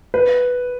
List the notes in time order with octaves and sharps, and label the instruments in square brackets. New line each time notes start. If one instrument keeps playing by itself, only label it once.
[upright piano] B4